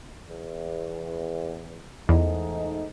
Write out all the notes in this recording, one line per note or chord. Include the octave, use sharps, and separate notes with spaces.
E2
E2 G#2 A3 D#4